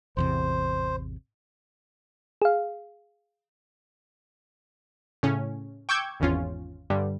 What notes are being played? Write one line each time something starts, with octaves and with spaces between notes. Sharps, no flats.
A1 E2 C3 C5
G#4 F5
A2 C#3 C#4
G5 C#6 D6 E6 G6 G#6
G#1 E2 C#4 F4
G2 D3 G3